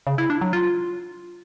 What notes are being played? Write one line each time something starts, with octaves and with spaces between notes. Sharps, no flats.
C#3
E4
D4
F#3
F4